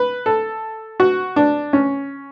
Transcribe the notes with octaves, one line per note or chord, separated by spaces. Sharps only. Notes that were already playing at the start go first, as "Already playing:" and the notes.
Already playing: B4
A4
F#4
D4
C#4